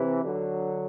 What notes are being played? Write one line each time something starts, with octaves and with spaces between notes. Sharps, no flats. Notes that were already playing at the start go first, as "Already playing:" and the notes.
Already playing: C3 E3
D3 F#3